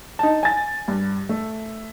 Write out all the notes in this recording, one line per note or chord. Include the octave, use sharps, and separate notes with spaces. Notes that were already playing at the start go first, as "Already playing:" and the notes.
D#4 A5
G#5 A6
G2
A3